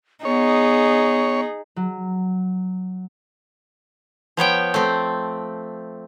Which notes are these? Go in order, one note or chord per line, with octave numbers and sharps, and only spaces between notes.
B3 D#4 G#4 C#5
F#3
F3 B3 C#5 G5
A3 C4